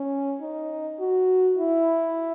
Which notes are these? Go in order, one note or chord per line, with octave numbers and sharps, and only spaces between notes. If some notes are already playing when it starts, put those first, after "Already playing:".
Already playing: C#4
D#4
F#4
E4